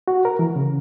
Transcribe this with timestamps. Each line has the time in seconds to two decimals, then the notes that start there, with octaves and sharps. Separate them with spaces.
0.08 F#4
0.25 A#4
0.39 E3
0.56 C#3